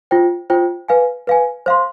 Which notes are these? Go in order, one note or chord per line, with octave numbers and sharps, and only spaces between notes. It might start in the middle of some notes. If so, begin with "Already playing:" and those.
F4 C5 G5
F4 C5 G5
B4 F5 G#5
B4 F5 G#5
C5 F5 C6